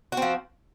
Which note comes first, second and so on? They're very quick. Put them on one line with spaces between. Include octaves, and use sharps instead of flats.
F#4 C4 F3